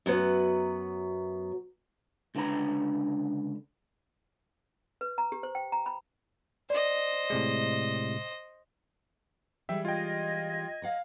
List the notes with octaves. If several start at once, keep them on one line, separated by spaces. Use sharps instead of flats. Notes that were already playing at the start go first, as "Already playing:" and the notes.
F#2 F#3 B3
C#2 D3 D4 B4 A#5 B5
B4
A#5
G4
C5
G5
A#5
B5
C5 D5 D#5
A2 C3 G#3
E3 G3 G#3 E5 G5
F4 D#5 G5 G#6
F5 F#5 A#5